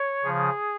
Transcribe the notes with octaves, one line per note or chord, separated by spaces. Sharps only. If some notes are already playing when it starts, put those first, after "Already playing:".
Already playing: C#5
C#3 F3 G#4